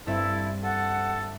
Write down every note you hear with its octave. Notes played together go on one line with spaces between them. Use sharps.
G2 C4 E4 A4 E5
A4 F#5